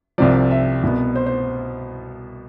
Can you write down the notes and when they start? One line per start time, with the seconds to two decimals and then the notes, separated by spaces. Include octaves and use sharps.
0.18 C2 C3 F3 D5
0.51 E5
0.83 C2 B2 B3
1.16 C5
1.26 C5